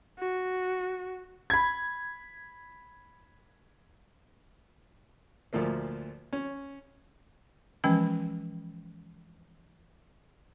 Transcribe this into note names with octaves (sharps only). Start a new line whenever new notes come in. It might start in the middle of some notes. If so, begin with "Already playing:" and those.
F#4
B5 G#6
D2 A#2 F3 A3 A#3
C#4
E3 F3 G#3 C#4 G5